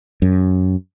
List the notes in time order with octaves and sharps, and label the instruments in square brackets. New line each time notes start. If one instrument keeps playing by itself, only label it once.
[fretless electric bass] F#2